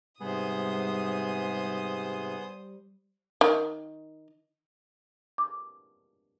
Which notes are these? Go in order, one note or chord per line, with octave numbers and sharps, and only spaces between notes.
G#2 C3 G3 B3 G#4 C5 D#6
D#3
D6